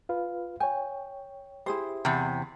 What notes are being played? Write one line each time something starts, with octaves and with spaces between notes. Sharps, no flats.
F4 B4 F5
C#5 G5 G#5
E4 G4 G#4 C5
E2 C3